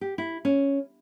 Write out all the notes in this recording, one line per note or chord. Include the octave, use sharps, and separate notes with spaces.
G4
E4
C#4